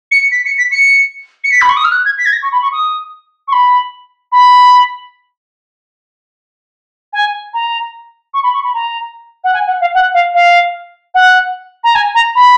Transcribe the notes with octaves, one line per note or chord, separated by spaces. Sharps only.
C#7
B6
C#7
B6
C#7
C#7
B6
B5
C#6
D#6
F6
F#6
G#6
B6
G#6
A#6
C#6
B5
C#6
D#6
C#6
B5
B5
G#5
A#5
C#6
B5
C#6
B5
A#5
F#5
G#5
F#5
F5
F#5
F5
F5
F#5
A#5
G#5
A#5
B5